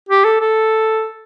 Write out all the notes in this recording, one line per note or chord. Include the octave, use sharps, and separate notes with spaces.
G4
A4
A4